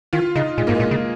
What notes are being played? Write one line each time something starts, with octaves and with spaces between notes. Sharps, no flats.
D#3 F4
C#3 D#4
A#2 G#3
G#2 A#3
A#2 G#3
C#3